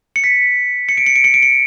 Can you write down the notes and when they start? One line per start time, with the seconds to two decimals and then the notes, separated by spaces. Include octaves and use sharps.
0.16 C#7
0.24 B6
0.89 C#7
0.97 D7
1.06 C#7
1.16 D7
1.24 C#7
1.34 D7
1.43 C#7